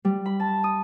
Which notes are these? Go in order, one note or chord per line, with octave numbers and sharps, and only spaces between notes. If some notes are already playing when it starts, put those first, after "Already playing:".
G3
B5
A5
D#6